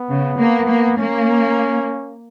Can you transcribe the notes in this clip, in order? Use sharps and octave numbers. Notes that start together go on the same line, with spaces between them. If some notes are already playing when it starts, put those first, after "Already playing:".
Already playing: B3
C#3
A#3
A#3
A#3 C#4